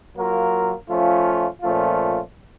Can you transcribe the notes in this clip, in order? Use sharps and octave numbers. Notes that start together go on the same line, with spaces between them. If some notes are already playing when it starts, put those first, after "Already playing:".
F#3 A#3 F4 A#4
F3 A3 C#4 F4
A#2 F3 A3 C#4 F4